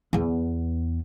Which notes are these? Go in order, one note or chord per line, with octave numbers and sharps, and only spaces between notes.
E2 B3